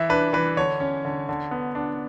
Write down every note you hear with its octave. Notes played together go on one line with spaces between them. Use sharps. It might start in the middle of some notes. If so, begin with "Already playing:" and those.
Already playing: E3 E5
D4 B4
E3 B4
D3 C#5
C#4
D3
D3
B3
D4